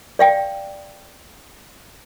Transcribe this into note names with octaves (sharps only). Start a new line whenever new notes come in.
D5 F5 G5